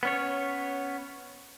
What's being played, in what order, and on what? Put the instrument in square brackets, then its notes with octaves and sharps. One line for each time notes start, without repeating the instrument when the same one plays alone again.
[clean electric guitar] B3 C#4 C#5